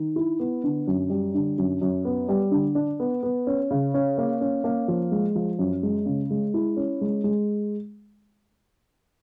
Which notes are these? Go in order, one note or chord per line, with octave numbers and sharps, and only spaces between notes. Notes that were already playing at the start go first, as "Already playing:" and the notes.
Already playing: D#3
E4
B3
D3
F#2
G3
D3
F#2
F#2
B3
G3
D3
D4
B3
B3
C#4
C#3
C#4
A#3
C#4
A#3
F3
G#3
F3
F#2
G#3
C#3
G#3
E4
C#4
G#3
G#3